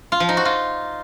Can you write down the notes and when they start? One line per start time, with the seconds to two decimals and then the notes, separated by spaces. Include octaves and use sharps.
0.12 F4
0.20 F3
0.29 D#4
0.37 F#4
0.45 F4